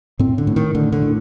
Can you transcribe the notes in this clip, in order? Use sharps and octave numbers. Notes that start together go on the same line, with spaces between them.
A2 C4
D3
A2
D#3
A2 D3
D3
A2